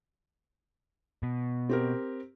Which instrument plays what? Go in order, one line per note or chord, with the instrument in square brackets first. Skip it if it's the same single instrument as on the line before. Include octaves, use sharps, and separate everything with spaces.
[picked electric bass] B2
[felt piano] C4 G4 A#4